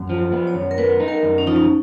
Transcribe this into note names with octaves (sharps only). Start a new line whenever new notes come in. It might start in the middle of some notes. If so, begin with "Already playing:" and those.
Already playing: F#2
F3
B3
C#5
F#2
A#4
B3 B4
D#4
A#4
F#2
C#4
F3 D#4
C#4